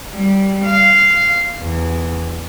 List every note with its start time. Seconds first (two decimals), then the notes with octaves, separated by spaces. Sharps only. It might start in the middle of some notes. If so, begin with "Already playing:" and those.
0.12 G3
0.65 F5
1.57 E2